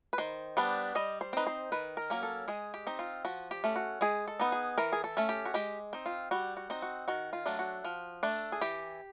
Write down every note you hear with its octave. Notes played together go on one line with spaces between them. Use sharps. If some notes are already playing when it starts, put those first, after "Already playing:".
B4
D#3 C5
G3 B3 D4
G3 D#5
C5
C4 D#4 B4
C5
D#3 B4
A#4
F#3 A#3 C#4
A4
G#3 G#4
G4
C4 D#4
F4
F3 F#4
G4
A3 C#4
F#4
G#3 G#4
A4
B3 D#4
G#4
E3 A#4
G#4
A4
A3 C#4
G4
F#4
G#3 G4
C4 D#4
F4
G3 F#4
F#4
C4 D#4
F#4
D#3 F#4
F4
F#3 A3 D4
F#4
F3
A3 D4
G#4
E3 G4